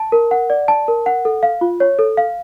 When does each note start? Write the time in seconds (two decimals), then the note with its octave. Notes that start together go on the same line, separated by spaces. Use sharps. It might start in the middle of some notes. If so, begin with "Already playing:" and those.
Already playing: A5
0.12 A#4
0.31 F#5
0.50 D5
0.68 A5
0.88 A#4
1.06 F#5
1.25 A4
1.43 F5
1.61 F4
1.80 C#5
1.99 A4
2.17 F5